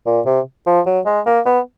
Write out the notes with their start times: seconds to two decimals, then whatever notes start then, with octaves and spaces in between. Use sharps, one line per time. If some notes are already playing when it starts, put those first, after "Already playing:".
0.06 A#2
0.26 C3
0.66 F3
0.86 F#3
1.06 G#3
1.26 A#3
1.46 B3